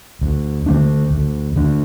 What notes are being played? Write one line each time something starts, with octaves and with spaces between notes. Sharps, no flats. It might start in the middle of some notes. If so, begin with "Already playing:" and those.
D2
D3 A3 D4
D2
D3 A3 D4